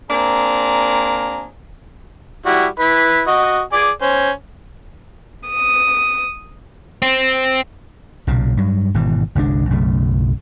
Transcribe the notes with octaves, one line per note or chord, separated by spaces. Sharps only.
A#3 C4 D4 G#4 A#5
G3 E4 F#4
E4 B4
F#4 D#5
G#4 D5 G#5
C#4 C5
D#6
C4
B1 A#2 C#3
G2 F#3
G#1 B2 E3
G1 C2 G#3 D4
B1 F#2 C#3 A3